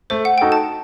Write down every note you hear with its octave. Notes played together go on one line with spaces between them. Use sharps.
A3 C5
F#5
D#4 F#4 A4 G5
A5